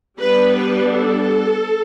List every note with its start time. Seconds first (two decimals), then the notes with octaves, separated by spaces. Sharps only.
0.19 G3 B3 D4 B4
0.57 B4
0.93 A4